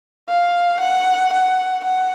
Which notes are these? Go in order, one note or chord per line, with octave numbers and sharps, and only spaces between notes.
F5
F#5
F#5
F#5